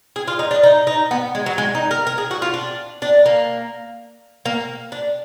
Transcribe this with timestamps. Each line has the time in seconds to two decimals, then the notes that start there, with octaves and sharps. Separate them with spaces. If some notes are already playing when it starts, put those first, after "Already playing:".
0.16 G#4
0.28 F4
0.39 D#4
0.51 D4
0.63 D#4
0.87 D#4
1.11 B3
1.35 G#3
1.46 F#3
1.58 G#3
1.75 D#4
1.91 A#4
2.07 A#4
2.18 G#4
2.31 F#4
2.42 F4
2.54 D4
3.02 D4
3.26 A#3
4.45 A#3
4.92 D4